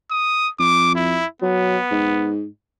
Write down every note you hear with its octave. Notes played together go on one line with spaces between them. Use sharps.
D#6
F2 D6
E4
F#3 B3
G#2